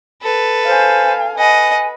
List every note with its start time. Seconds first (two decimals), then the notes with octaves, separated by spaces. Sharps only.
0.22 A4 B4
0.66 C5 F5 G#5
1.39 B4 D#5 F#5 G#5